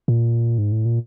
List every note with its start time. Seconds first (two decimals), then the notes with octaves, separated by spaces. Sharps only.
0.08 A#2
0.58 G#2
0.72 A2
0.85 A#2